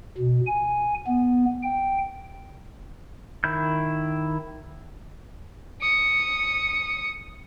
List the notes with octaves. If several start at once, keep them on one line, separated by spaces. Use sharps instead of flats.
B2
G#5
B3
G5
D#3 E4 G6
D#6 C#7